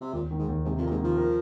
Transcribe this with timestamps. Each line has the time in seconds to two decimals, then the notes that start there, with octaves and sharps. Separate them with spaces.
0.01 C3
0.13 D#2 A#2
0.31 D#3
0.39 G#2
0.48 D#2
0.65 G#2 C3
0.78 F2
0.82 A#2 A#3
0.91 G#2
1.00 D#3 F3
1.17 A#4